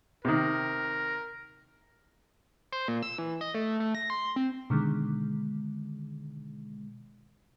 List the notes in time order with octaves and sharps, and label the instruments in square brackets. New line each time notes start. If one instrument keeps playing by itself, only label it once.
[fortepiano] C3 D#3 [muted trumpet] A#4
[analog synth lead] C5
A#2
E6
E3
D#5
A3
A3
A#6
C6
C4
[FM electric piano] B2 D3 D#3 G#3